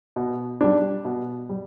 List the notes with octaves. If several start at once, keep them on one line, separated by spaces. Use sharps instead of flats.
B2
G3 D4
B2
G3